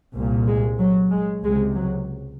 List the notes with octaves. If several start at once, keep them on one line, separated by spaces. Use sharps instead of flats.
C2 A#2
G#3
F#3
G#3
C#2 C3 G#3
F#3